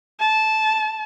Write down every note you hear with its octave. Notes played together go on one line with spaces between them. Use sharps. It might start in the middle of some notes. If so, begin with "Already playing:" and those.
A5